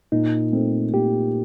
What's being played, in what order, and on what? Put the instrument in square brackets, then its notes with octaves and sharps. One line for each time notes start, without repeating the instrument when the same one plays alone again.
[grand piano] A#2 [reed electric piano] D#4
[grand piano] A3 C4
[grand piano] A#2 [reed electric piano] G4